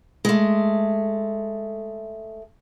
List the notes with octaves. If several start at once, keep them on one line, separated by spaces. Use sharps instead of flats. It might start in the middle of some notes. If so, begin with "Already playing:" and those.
G#3 A3